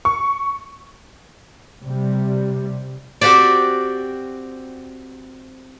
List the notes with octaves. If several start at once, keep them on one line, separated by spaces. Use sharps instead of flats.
C#6
C3 G3
C4 F#4 G4 C5 D5